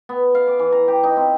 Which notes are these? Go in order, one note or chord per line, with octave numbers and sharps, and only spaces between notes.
B3
F5
D6
E3
A#5
G4
D#4
C4